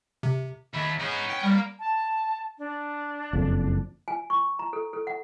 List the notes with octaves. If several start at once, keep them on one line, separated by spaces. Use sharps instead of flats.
C3
D#2 E5 B5
B3 C#4 D#4 G#4
G5
G3 A#3 A#4
A5
D4
F#1 F2
G#5
C#6
A#5
A4
A4
F#5